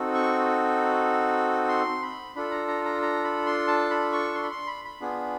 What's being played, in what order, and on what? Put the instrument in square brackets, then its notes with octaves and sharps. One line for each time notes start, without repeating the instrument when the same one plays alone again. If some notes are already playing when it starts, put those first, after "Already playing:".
Already playing: [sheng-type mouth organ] C4 D#4 F#4 A4
C#6
C6
B5
D4 F4 A4 B5
A#5
A#5
A#5
A#5
B5
C6
A5
B5
C#6
C6
B5
C6
B5
B5
B3 D4 F4 G#4